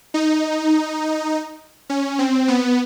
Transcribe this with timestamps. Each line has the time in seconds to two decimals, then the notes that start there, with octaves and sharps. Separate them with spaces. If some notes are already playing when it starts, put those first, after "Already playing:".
0.14 D#4
1.90 C#4
2.19 C4
2.48 B3